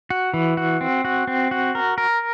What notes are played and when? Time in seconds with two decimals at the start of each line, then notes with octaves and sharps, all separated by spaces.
0.10 F#4
0.34 E3
0.57 F#4
0.81 C4
1.05 F#4
1.27 C4
1.51 F#4
1.75 A#4
1.98 A#4